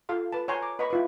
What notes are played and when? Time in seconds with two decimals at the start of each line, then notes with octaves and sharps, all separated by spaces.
0.09 F4 A4 F5 C6
0.32 B4 A5
0.48 C#5 F#5 G#5 A#5 C6
0.62 A#5 D6
0.79 B4 D#5 F#5 B5 C#6
0.90 E4 F4 B4